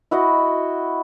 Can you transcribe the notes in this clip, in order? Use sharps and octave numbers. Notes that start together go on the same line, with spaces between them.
E4 F#4 D#5